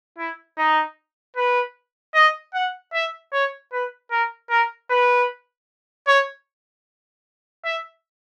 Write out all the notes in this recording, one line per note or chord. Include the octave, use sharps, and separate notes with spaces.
E4
D#4
B4
D#5
F#5
E5
C#5
B4
A#4
A#4
B4
C#5
E5